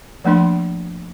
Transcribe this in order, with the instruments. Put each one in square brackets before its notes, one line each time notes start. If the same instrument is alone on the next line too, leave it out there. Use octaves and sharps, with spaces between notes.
[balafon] F3 A3 A#3 D4 C6